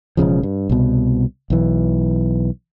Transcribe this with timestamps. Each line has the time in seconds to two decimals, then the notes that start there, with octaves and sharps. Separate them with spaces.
0.17 E1 A#1 C#3 F3
0.43 G2
0.69 C2 B2
1.50 B1 E3